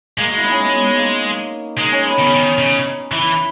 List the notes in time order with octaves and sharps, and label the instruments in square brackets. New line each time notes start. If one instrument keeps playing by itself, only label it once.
[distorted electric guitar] G#3 [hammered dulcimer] A#3
[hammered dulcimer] F#4
E4
D#4
C#4
B3
A#3
[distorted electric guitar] G#3 [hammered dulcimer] D#4
[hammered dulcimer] C#4
B3
[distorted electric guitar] D#3 [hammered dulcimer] C#4
[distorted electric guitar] C#3
D#3
[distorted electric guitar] C#3 [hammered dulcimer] D#4
[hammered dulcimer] D#4
[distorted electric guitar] E3 [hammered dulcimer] E4